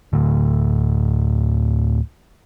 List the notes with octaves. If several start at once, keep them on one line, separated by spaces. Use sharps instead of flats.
D1 D2